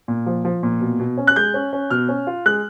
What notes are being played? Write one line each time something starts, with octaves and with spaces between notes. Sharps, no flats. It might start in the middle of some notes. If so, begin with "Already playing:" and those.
A#2
F3
F3
A#2
B2
B2
C#4
F#6
G#3 G6
C#4
C#4
B2 F6
C#4
F4
G#3 F#6